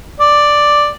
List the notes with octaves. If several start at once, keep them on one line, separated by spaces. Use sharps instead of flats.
D5